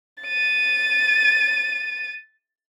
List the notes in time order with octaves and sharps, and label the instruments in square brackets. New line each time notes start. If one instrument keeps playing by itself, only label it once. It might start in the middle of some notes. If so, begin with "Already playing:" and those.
[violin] A6 D#7